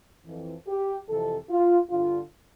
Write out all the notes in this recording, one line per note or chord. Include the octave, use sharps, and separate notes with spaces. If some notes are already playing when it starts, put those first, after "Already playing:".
F2 E3
G4
F2 C3 E3 A4
F4
G2 D3 F4